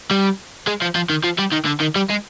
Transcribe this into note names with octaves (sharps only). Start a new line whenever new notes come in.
G3
G#3
F3
F3
D#3
F3
G3
D#3
D3
D#3
G3
G#3